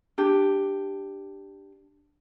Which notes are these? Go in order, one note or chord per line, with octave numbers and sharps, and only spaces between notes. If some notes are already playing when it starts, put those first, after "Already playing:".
D4 G4